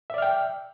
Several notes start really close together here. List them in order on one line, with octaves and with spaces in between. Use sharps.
E5 D5 F6 G5